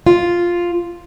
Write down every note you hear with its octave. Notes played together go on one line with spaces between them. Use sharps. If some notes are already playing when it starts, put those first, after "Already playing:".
F4